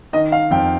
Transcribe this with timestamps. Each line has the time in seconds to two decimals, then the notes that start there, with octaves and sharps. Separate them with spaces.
0.13 D#3 D#5
0.32 F5
0.51 F2 G5